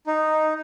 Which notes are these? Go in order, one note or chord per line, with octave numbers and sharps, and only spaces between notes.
D#4